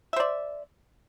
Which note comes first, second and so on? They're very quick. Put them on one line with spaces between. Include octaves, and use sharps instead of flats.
E5 C5 D5